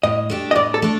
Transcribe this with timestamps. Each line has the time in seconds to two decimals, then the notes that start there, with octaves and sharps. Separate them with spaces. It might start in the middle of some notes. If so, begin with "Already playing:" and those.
0.03 A2 D#5
0.30 A3 D4 G4
0.51 D#5
0.56 A2 D5
0.74 A4
0.82 A3 D4